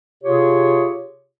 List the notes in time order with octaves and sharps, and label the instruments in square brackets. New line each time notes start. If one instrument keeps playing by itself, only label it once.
[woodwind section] C3 F4 G4 G#4 C#5